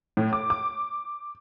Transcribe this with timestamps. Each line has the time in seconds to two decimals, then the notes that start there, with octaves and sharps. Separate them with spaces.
0.17 A2
0.33 D6
0.50 D6